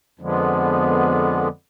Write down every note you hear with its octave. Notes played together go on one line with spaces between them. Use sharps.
F2 D3 F3 G#3 B3